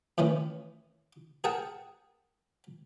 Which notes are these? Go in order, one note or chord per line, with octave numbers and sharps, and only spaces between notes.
A2 D#3 E3 C#4
G#4 A#4 F#5 G5 A5